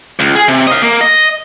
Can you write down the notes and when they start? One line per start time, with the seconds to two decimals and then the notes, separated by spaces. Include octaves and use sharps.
0.20 C#2
0.35 G#4
0.48 C3
0.67 D#5 F5
0.82 A#3
1.01 D#5